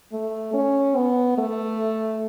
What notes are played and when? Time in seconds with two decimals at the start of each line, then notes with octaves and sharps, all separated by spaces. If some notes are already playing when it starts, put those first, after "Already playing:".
0.13 A3
0.54 C#4
0.96 B3
1.38 A3